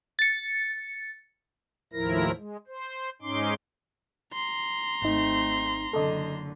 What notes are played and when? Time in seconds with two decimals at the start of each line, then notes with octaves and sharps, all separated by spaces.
0.19 A6 C#7
1.93 D#2 A2 F3 E4 A#4 A#6
2.37 G#3
2.67 C5
3.22 G#2 C#4 D#4 C6 D6
4.33 A#5 C6
5.02 G#1 A3 C4 D#4
5.93 F#1 D3 A4 D#5